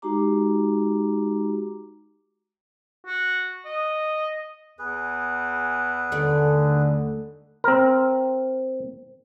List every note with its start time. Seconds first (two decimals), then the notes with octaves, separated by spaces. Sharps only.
0.02 G#3 D#4 F#4 G4 A#5 D6
3.06 F#4
3.65 D#5
4.79 E2 G#4 B4
6.12 D#2 D3 A3 D5
7.64 C4 A#4